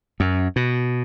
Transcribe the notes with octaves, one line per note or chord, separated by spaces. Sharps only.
F#2
B2